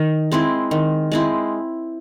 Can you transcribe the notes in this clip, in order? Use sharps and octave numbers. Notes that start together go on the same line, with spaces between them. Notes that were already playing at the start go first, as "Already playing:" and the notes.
Already playing: D#3
G#3 C4 E4
D#3
G#3 C4 E4